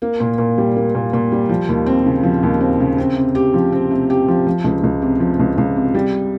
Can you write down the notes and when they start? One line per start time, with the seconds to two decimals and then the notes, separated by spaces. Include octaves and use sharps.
0.02 A#3
0.20 A#2
0.38 A#2
0.58 G3
0.76 A#3
0.95 A#2
1.13 A#2
1.32 G3
1.49 F3
1.69 D#2
1.86 C4
2.06 C#3
2.23 F3
2.43 D#2
2.60 C4
2.80 C#3
2.98 C4
3.16 C3
3.35 G4
3.54 F3
3.72 C4
3.91 C3
4.10 G4
4.28 F3
4.47 F3
4.64 C#2
4.83 C#2
5.02 C3
5.20 F3
5.39 C#2
5.58 C#2
5.76 C3
5.94 G3